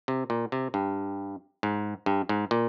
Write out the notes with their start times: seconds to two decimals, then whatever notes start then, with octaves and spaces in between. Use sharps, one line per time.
0.08 C3
0.30 A#2
0.52 C3
0.74 G2
1.63 G#2
2.06 G2
2.29 G#2
2.51 A#2